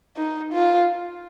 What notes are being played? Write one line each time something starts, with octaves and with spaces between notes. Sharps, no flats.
D#4
F4